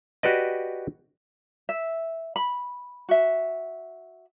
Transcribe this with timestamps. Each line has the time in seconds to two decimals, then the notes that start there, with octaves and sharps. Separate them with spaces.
0.23 F#4 G4 B4 D5 D#5
1.69 E5
2.36 B5
3.09 F#4 E5